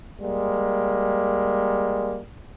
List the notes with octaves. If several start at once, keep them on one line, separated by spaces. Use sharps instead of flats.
G3 G#3 A#3